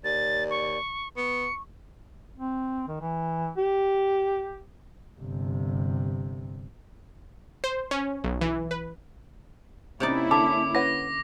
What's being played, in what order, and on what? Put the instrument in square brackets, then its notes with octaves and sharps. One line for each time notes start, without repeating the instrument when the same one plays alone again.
[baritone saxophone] D#2 [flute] D5 [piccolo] A6
[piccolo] C#6
[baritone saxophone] B3 [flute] C#6 [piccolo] C#7
[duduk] C4
D#3
E3
G4
[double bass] G1 C3
[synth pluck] C5
C#4
B1
E3
B4
[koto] C3 D#4 D5 [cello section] A#3 C#4 E4
[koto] D3 [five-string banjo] A4 [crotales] D6
[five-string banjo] B4 C#5 F#5 [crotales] A#6